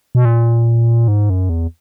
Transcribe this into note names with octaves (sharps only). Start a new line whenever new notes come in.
B2
A#2
G#2
F#2
E2